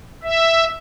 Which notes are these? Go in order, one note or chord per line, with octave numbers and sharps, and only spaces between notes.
E5